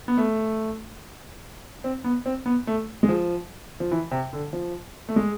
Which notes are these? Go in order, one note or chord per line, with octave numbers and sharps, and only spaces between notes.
B3
A3
C4
B3
C4
B3
A3
G#3
F3
F3
E3
C3
D3
F3
A3
G#3